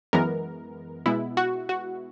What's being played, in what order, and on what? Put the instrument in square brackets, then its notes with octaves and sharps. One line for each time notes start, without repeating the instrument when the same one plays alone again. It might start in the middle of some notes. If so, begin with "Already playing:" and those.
[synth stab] F#2 E3 G#3 B3 A#4
B2 G#3 B3 E4
F#4
F#4